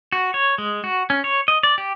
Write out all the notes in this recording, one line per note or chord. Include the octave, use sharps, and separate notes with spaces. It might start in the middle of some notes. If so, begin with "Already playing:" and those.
F#4
C#5
G#3
F#4
C#4
C#5
D#5
D5
G4